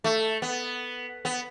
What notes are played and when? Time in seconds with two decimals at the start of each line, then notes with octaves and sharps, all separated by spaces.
0.04 A3
0.42 B3
1.25 B3